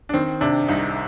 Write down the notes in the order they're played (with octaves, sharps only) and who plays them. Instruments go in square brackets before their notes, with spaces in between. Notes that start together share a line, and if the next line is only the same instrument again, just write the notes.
[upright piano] D4
D#3 C4
C3 D4
C2 D#4